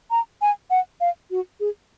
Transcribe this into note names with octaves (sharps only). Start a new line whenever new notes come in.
A#5
G#5
F#5
F5
F#4
G#4